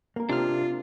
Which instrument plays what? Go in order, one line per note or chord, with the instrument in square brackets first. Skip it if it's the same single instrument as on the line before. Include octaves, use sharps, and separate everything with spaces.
[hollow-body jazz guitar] A#3 A#4
[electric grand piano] C3 [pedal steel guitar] D4 F6 [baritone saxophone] F4